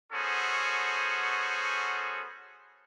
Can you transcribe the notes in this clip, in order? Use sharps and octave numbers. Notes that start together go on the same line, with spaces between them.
B3 C#4 F#4 G#4 A4 C5